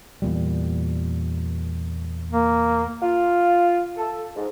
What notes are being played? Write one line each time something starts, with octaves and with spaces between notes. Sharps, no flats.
E2 A#2 G3
A#3
F4
A4
G#2